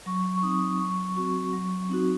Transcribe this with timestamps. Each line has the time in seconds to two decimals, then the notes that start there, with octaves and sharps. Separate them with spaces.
0.06 F#3 C#6
0.36 C#6
0.43 C4 D#4 D#6
0.80 F#3 C#6
1.16 C4 F#4 C#6
1.53 F#3
1.89 C4 D#4 F#4